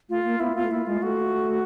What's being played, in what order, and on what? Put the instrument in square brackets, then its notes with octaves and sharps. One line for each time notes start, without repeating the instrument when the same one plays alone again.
[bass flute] A3 [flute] F4
[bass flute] A#3
[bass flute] B3 [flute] E4
[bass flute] B3 [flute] F4
[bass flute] A3
[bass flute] A#3 [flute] E4
[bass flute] G#3 [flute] F4
[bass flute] A3 [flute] F#4